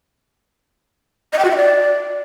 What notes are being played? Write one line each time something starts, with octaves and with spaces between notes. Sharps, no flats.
D#5
G5
F#4
E5
D5